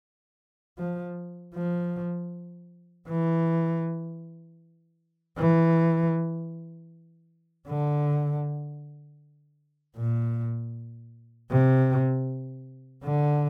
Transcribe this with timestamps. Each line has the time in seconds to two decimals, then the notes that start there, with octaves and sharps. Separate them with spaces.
0.78 F3
1.55 F3
3.08 E3
5.38 E3
7.67 D3
9.97 A#2
11.51 C3
13.04 D3